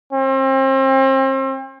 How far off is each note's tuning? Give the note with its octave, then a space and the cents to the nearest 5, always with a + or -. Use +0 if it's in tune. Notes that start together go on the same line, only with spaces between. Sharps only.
C4 +35